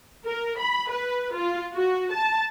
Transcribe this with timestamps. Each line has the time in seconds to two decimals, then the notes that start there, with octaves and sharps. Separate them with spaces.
0.24 A#4
0.59 B5
0.90 B4
1.33 F4
1.74 F#4
2.12 A5